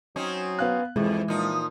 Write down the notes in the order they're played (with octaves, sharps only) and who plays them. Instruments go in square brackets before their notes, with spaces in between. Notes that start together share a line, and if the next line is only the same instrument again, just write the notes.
[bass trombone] F#3 [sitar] C4 C#4 D#4
[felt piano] B3 F5 F#6
[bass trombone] F2 [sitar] G#2 [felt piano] E3 [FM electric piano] G#3
[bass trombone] A#2 [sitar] F3 D#4